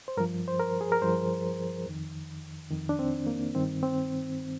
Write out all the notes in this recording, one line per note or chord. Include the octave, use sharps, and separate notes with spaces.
C5
G2 F3 A#4
C5
A#4
G#4
A#4
G2 F3 C5
F2 D#3
F2 D#3
D4
C4
A#3
G2 D#3 C4
C4